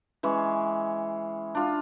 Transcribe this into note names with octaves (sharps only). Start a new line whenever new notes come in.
E3 G#3 C#4
D4 F4